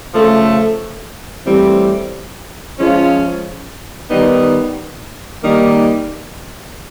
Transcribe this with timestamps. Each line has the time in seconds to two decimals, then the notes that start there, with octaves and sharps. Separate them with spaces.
0.13 C#3 F3 A3
1.45 A2 E3 G3 C4
2.77 F3 G#3 C#4 F4
4.09 D#3 G3 B3 D#4
5.42 D#3 G3 A#3 D#4